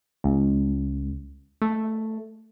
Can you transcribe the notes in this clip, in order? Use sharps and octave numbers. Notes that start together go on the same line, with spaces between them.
C#2
A3